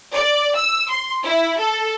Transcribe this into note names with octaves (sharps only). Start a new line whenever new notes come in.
D5
E6
C6
E4
A4